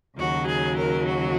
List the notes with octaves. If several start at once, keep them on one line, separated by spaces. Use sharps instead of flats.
D#2 C#3 F#3 F#4
G#4
A#4
F#4